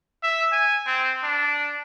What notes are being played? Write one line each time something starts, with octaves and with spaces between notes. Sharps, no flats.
E5
G#5
C4
D4